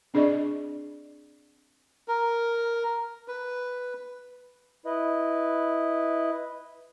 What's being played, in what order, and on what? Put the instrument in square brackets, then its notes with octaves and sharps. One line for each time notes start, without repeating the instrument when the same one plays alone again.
[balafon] C4 D4 G#4 D5 D#5 C#6
[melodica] A#4
B4
[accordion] E4 B4 D#5